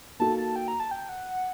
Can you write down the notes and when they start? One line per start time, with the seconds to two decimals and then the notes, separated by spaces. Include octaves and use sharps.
0.20 A#3 D#4 F#4 A4 A5
0.38 A5
0.56 G5
0.68 A#5
0.80 A5
0.91 G5
1.09 F#5